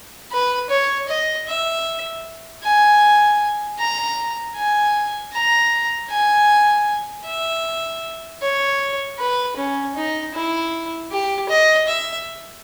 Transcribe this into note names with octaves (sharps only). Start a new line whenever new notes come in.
B4
C#5
D#5
E5
G#5
A#5
G#5
A#5
G#5
E5
C#5
B4
C#4
D#4
E4
G4
D#5
E5